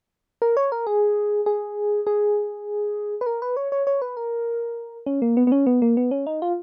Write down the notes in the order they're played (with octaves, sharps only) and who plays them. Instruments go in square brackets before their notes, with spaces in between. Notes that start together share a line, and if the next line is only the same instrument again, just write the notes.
[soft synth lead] A#4
C#5
A#4
G#4
G#4
G#4
B4
A#4
B4
C#5
C#5
C#5
B4
A#4
C#4
A#3
B3
B3
C#4
B3
A#3
B3
C#4
D#4
F4